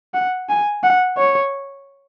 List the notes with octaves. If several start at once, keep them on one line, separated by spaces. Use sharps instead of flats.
F#5
G#5
F#5
C#5